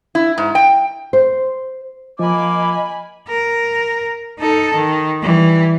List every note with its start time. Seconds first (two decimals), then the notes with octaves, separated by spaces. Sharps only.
0.15 E4
0.38 G#2
0.55 G5
1.13 C5
2.19 F3 A#3 F4 D#5 G#5 B5 D6
3.28 A#4
4.39 D#4 A4
4.75 D#3
5.22 E3 G3